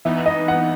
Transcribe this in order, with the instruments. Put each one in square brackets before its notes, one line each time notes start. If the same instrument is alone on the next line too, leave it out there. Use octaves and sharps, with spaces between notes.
[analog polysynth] E3 B3 D#4 [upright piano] E5
[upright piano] D#5
F#5